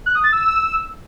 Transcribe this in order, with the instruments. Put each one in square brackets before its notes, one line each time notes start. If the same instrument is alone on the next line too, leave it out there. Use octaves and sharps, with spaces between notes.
[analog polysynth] F#6
D#6
A6
E6